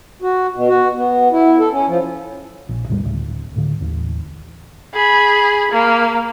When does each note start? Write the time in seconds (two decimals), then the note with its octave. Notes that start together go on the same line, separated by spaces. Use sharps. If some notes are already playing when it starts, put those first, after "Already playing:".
0.22 F#4
0.55 B2
0.68 F#4
0.97 B3
1.32 E4
1.59 A4
1.72 C#4
1.88 F3
2.69 A#1
2.89 E2 A2 C#3 G3
3.04 D1 D2 A2
3.56 A2 D3
3.81 A1 D#2
4.94 G#4 B5
5.71 A#3